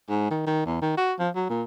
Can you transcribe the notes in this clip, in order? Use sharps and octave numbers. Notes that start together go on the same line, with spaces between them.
G#2
D#3
D#3
E2
D#3
F#4
F3
F#3
A#2